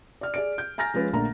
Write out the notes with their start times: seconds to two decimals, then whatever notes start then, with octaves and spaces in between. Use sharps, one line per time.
0.21 D5 F6
0.34 G#4 D5 D7
0.58 G6
0.78 G#5 A#5 F6 A6 A#6
0.94 F3 G#3 C#4 B4
1.13 A#1 D3 A3 A#3 A#5